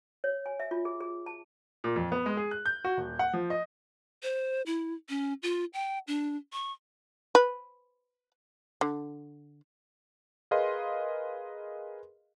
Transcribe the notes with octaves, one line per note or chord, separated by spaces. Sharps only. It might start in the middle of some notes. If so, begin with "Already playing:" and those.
C#5
G#5
E5
F4
G#4
G#4
A5
A#2
F2
B3
G#3
G#4
F#6
G6
F#4
D#1
F#5
F3
D#5
C5
E4
C#4
F4
G5
D4
C#6
B4
D3
G#4 A#4 B4 D#5 F5 C6